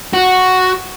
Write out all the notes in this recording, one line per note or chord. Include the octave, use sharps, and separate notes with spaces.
F#4